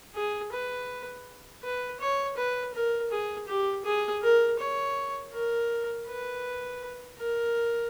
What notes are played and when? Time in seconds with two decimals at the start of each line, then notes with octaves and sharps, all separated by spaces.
0.15 G#4
0.52 B4
1.64 B4
2.00 C#5
2.37 B4
2.74 A#4
3.11 G#4
3.48 G4
3.85 G#4
4.22 A#4
4.60 C#5
5.33 A#4
6.07 B4
7.19 A#4